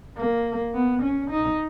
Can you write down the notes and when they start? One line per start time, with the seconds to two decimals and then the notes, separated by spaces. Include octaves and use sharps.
0.17 A#3
0.74 B3
1.02 C#4
1.31 D#4